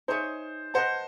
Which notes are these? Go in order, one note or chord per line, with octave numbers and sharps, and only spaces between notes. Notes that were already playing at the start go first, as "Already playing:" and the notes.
D#4 G#4 C5 C#5 E5
B4 C5 D#5 F#5 A5